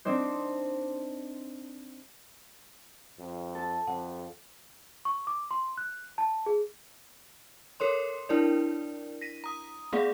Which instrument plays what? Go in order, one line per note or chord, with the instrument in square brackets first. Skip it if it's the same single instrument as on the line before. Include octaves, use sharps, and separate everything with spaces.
[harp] C4 D4 D#4 C5
[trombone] F2
[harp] A4 A5
[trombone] F2 [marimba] F#5
[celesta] C#6
D6
C6
F#6
A5
G#4
[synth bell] A4 A#4 C#5 C6
D4 E4 A#4 D5
A#6 B6 D#7
A#5 D#6
A3 B3 G#4 D5 F5 F#5